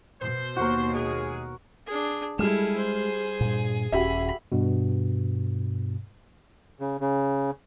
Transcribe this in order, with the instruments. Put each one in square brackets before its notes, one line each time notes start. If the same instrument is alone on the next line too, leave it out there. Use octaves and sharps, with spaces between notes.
[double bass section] B2 [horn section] C5
[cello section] D#2 [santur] F#4 A#4
[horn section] G#3 G#4
[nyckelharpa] D4 G#4
[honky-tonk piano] G3 F6 E7 [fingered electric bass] G#3 [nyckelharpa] E4 A4 [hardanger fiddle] G#4
[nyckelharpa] C5
[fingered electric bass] G2 A#2
[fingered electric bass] D#1 C#4 [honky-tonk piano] F#4 G4 E5 [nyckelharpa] B5
[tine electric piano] G2 B2
[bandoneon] C#3
C#3